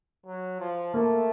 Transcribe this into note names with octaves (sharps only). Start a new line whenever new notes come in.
F#3
F3
A3 A#3